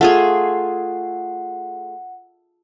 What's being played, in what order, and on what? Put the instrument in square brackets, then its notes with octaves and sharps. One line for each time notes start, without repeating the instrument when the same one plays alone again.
[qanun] A3 F4 G#4 [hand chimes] F#5